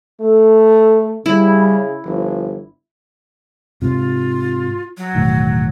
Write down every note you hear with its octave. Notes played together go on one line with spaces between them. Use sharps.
A3 A4
C#3 G3 E4
G1 F3
G#2 C3 F4
F#3
E1 A2 D#3